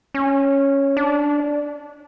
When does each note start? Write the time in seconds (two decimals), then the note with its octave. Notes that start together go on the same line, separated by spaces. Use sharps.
0.14 C#4
0.97 D4